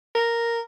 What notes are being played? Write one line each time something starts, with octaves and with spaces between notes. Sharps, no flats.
A#4